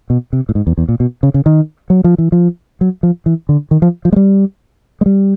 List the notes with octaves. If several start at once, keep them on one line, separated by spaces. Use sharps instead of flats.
B2
C3
A2
G#2
E2
E2
A#2
B2
C#3
C#3
D#3
F#3
F3
E3
F3
F#3
F3
E3
D3
D#3
F3
F3
G#3
G3
G#3
G3